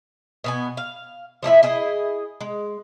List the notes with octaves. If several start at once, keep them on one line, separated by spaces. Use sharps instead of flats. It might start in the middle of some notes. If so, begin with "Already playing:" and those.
B2 B3 G#5
F5
F3 A3 E4 E5
E4 G#4 D#5
G#3